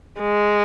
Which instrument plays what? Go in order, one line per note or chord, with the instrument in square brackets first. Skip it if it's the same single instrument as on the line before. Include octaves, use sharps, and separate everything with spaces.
[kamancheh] G#3